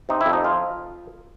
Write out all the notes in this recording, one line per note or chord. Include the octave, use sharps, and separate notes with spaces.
C3 D#4
E4
F2
D#4
F3 F4